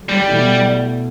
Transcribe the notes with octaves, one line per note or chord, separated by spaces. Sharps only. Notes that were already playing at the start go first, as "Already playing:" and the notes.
Already playing: F#2 D3
G3
B2 A3 E4